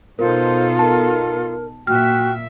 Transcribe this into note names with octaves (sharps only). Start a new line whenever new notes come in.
B2 D#4 F4 A4 A#4 C5
A#4 A5
A#2 F#4 E5 G5 F6